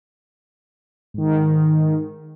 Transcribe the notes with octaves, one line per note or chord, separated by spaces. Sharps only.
G#2 D#3